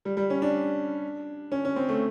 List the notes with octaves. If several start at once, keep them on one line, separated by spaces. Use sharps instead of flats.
G3
G3
C#4
D4
C#4
C#4
C4
A3